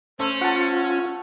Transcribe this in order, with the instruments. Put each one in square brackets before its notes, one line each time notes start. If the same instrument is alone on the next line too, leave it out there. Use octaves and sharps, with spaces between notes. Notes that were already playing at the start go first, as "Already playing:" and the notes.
[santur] A3 [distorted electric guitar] C#4 [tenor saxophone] C5
[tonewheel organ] F4 [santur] F#5 A5